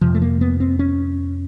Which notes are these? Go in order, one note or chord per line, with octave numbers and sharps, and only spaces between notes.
F2 C3 F3
A3
A#3
B3
C4
C#4